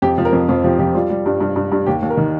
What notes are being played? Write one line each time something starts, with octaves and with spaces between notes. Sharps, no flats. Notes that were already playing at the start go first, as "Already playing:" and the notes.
F2 G4
F3
A#4
F2
F2 F4
F3 G4
F3 G4
G3 F4
G3
G2
G2
G2
G2
D#2 G4
D#2
A#4
D#3